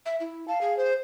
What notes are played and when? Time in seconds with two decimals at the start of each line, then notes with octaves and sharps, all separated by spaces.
0.06 E5
0.20 E4
0.48 F5 A5
0.61 G#4
0.77 C5